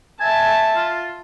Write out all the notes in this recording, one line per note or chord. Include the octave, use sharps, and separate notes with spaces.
E5 G#5 A5
F4